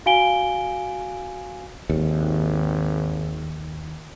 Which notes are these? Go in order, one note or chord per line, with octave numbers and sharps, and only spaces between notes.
F#4 F5 G#5 D7 G7
G#1 D#2